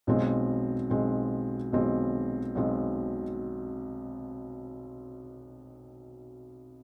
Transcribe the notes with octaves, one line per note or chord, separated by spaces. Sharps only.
B1 B2 G#3 C4
B1 B2 G#3 C4
B1 B2 G#3 C4
B1 B2 G#3 C4